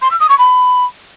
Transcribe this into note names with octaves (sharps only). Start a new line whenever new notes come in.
C6
E6
D#6
C#6
B5